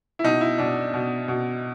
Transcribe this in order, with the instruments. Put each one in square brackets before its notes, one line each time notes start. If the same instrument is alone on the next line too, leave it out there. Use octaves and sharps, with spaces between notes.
[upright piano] E4
B2 D#4
E4
B2 D4
B2
B2